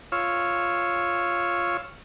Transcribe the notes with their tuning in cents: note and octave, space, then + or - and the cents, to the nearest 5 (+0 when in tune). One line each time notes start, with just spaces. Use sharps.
F4 +0 C#5 +0 E6 +0